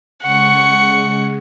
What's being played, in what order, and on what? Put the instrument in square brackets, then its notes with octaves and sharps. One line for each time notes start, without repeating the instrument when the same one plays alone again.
[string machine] C#3 G#3 [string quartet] F#5 C#6